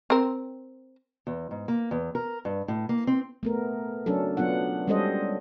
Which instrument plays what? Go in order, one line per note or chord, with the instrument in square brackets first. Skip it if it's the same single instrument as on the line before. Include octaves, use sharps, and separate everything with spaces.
[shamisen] C4 A#4
[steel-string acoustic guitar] E2
G#2
A#3
E2
A#4
G2
A2
A#3
C4
[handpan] A3 B3 A#4
F#3 C#4 D4 A4
F#3 B3 D4 F4 F#5
G3 G#3 C#4 A4 C5 D#5